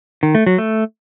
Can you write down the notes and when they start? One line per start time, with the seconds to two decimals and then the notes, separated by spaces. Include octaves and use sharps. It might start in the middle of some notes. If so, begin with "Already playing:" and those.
0.23 D#3
0.35 A3
0.46 F#3
0.58 A3